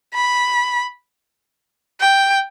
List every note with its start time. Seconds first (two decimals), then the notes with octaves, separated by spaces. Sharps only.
0.14 B5
2.01 G5